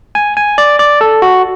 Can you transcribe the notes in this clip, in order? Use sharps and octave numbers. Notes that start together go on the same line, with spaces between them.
G#5
G#5
D5
D5
A4
F#4